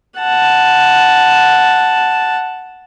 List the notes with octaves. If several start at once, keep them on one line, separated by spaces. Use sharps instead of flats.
F#5 A5